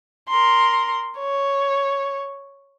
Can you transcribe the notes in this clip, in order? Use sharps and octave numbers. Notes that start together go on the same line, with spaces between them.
A#4 C6
C#5